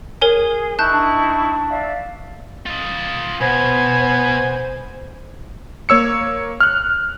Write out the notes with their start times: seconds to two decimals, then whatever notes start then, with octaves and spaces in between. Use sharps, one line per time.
0.21 G#4 A#4 C#5 G#5
0.79 D#4 E4 A5 C#6 F#6 G6
0.92 D4
1.70 D5 E5 F5
2.66 F4 D#5
3.41 B2 B3 C5 G#5
5.89 A#3 C#5 E6 C#7
6.60 F6 F#6